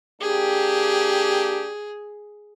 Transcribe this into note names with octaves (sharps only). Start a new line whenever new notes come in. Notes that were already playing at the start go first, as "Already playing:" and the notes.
A#3 D4 G4 G#4